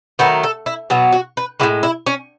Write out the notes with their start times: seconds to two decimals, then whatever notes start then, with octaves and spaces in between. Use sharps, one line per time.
0.19 D#3 F#3 A3 B4
0.43 A4
0.66 E4
0.90 B2 F#3 B3
1.13 F#4
1.37 B4
1.60 A2 E3 G#3 E4
1.83 E4
2.06 C#4